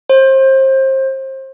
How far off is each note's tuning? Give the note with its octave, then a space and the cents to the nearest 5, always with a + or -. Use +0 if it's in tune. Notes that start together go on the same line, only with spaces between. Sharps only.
C5 +30